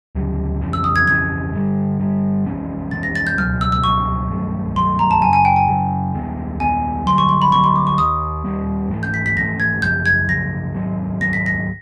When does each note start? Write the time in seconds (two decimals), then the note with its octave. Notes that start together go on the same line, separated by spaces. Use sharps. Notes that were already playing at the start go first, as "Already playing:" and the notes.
0.15 D2 C#3 F#3
0.61 F2 C#3 E3
0.73 E6
0.84 D#6
0.96 G#6
1.08 F2 C#3 E3 G#6
1.53 G2 D3 G3
1.99 G2 D3 G3
2.46 C3 E3 G#3 C#4
2.91 C3 E3 G#3 C#4 A6
3.03 A#6
3.15 A6
3.27 G6
3.38 C#2 B2 F#3 A#3 F6
3.61 E6
3.72 E6
3.84 C#2 B2 F#3 A#3 C#6
4.30 G2 D#3 F#3 A3
4.76 G2 D#3 F#3 A3 C6
4.99 A#5
5.11 A5
5.22 F#3 G#5
5.25 F#2 C#3
5.33 G#5
5.45 G5
5.56 G#5
5.68 F#2 C#3 F#3
6.14 D#2 D#3 G#3 B3
6.60 D#2 D#3 G#3 B3 G#5
7.06 G2 D3 F#3 C6
7.18 C#6
7.29 C6
7.42 B5
7.52 G2 D3 F#3 C#6
7.64 C6
7.76 D6
7.87 C#6
7.98 D#2 D#3 G3 A#3 D#6
8.45 D#2 D#3 G3 A#3
8.90 G#2 E3 A3
9.03 G6
9.14 B6
9.26 B6
9.37 G#2 E3 A3 A#6
9.60 G#6
9.82 F#2 C#3 F3 G6
10.06 G#6
10.28 F#2 C#3 F3 A#6
10.74 G#2 D#3 F#3 A#3
11.21 G#2 D#3 F#3 A#3 A#6
11.33 B6
11.46 A#6